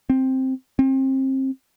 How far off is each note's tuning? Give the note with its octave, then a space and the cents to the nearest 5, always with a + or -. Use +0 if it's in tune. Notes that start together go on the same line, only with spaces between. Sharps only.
C4 +5
C4 +30